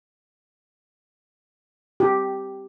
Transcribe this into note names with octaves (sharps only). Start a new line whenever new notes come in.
G4